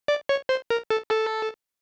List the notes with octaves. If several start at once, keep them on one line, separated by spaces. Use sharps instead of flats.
D5
C#5
C5
A#4
A4
A4